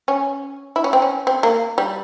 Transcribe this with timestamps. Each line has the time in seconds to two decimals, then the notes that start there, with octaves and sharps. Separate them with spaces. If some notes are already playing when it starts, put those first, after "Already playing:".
0.08 C#4
0.76 E4
0.84 C#4
0.93 C4
1.02 C#4
1.27 C4
1.43 A#3
1.78 G3